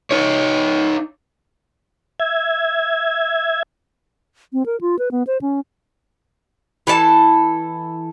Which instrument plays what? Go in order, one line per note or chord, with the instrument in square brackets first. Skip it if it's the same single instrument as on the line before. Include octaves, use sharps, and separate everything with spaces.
[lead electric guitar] D#4 C#5
[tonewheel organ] E5 G#6
[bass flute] C4
A#4
F4
B4
B3
C5
C#4
[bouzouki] E3 A4 C5 A5